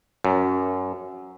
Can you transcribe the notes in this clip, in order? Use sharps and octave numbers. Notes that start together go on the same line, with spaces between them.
F#2